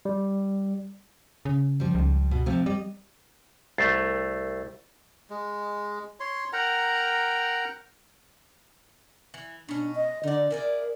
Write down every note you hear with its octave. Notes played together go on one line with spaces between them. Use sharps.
G3
C#3
F3 G3
C#2
B2
C3 F3 A3
G3 D#5
C2 A3 A6 C7
G#3
C#5 C6
A#4 F#5 G5 A#5
E3
B2 C#4 D4
D#5
D3 D#4 D5
E4 G#4 A#4 D5